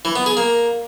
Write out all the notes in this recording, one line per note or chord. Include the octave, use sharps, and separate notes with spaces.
E3
B3
G#4
A#3